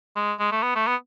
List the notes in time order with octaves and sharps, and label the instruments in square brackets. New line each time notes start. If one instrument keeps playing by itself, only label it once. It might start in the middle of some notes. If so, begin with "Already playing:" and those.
[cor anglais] G#3
G#3
A3
B3
A3
B3